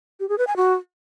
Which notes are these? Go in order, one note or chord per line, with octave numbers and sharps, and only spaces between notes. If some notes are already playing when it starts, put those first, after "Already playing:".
G4
G#4
B4
G#5
F#4